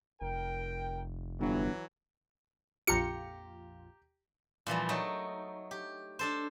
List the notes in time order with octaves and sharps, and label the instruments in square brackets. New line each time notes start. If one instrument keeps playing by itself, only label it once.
[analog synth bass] F1 [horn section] A#4 G5
[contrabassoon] G1 [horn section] E3 F#3
[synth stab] A#1 F2 F4 [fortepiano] G4 A#5 [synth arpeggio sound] C#7
[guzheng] A#2 E3 F3 G3
F#3 A3 D#4
G4
D4 A4 C5